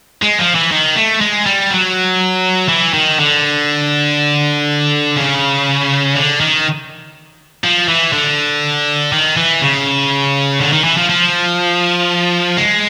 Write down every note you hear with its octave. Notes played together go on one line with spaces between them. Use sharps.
G#3
F3
E3
D#3
A3
G#3
G3
F#3
E3
D#3
D3
C#3
D3
D#3
F3
E3
D3
D#3
E3
C#3
D3
D#3
E3
F3
F3
G#3